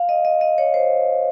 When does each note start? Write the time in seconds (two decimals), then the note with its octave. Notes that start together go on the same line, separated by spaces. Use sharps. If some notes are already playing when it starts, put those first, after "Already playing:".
Already playing: F5
0.09 D#5
0.25 D#5
0.41 D#5
0.58 C#5
0.74 C5